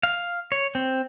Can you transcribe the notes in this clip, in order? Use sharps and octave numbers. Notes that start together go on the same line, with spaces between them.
F5
C#5
C4